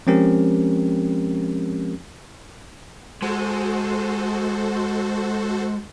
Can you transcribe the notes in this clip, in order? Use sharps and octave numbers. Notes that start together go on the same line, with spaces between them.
F3 G#3 C4 C#4 G4 A#4
G#3 F#4 A4 C5